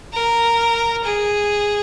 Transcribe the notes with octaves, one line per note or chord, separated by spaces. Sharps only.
A#4
G#4